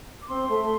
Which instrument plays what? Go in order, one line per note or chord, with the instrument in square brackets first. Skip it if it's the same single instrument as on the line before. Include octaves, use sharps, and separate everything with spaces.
[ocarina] D6
[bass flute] C4 [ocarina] C6
[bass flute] A3